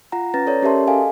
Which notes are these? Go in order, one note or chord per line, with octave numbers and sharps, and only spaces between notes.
F4 F#5 A#5
C#4 B4 A#5 A6 A#6
A4 C#5 D5
C#4 G4 A#4 E5 A5 C6
G#4 A4 D#5 F5 G#5